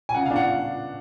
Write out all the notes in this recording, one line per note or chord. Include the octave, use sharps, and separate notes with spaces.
G#5
C#3 F#5
F5
D4
F#5